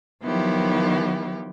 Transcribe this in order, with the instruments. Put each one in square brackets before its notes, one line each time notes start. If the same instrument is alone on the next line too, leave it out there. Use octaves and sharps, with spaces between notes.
[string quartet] D#3 F3 F#3 B3 E4 G4